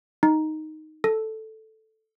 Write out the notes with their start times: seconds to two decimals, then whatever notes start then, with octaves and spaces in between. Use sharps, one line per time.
0.23 D#4
1.04 A4